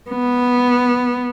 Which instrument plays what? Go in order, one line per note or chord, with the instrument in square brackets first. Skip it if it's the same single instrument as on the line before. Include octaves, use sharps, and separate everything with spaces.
[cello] B3